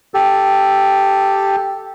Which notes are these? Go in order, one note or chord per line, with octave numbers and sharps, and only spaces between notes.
G4 A4